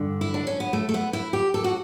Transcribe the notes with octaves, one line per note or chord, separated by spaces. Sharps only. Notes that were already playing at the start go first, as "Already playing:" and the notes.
Already playing: G2 D3
E4
D4
C#4
B3
A3
A3
B3
E4
G4
A4
F#4